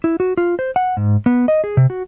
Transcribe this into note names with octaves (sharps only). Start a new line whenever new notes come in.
E4
F#4
F4
C5
F#5
G#2
B3
D#5
G#4
C3
F#4